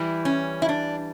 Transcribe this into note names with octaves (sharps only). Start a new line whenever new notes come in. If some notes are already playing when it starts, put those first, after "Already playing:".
Already playing: E3 G3 E4
C#4
E4
D4